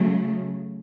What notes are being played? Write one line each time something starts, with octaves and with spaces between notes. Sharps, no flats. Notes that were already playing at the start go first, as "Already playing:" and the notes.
Already playing: C#3 F#3 A3